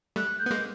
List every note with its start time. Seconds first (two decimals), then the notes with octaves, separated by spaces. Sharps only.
0.16 G3 A3 F#6
0.39 G6
0.46 B3
0.51 G#3 A#3